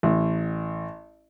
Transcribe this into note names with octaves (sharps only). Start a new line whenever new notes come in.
A1